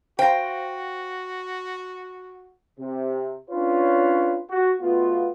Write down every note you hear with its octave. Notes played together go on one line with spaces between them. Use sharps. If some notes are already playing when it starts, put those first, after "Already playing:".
F#4 C5 F5 G5 A#6
C3
C#4 D4 F4 B4 C#5
F#4
B2 A3 B3 F4